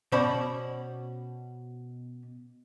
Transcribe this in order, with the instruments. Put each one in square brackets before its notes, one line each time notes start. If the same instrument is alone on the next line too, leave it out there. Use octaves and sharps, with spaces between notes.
[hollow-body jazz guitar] B2 C#4 C5 D5 B5